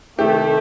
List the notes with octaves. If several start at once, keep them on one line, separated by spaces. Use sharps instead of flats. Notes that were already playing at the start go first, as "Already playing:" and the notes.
C3 D#3 A3 G4